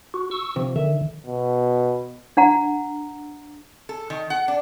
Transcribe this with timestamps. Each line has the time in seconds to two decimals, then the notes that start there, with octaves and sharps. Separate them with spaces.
0.14 F#4
0.31 C#6 E6
0.56 C3 F3
0.76 D3 D#3 E5
1.27 B2
2.37 D4 F#5 A#5
3.89 A4
4.10 D#3
4.30 F#5
4.48 D4